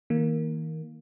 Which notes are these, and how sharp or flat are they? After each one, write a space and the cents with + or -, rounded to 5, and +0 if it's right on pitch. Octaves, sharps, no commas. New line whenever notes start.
D#3 +40 A#3 +0